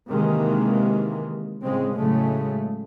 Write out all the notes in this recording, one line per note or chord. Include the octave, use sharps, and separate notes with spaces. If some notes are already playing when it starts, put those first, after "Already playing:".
C3 D#3 E3 G#3 A#3
A2 C#3 G#3 C4
A2 C#3 F#3 G#3 A3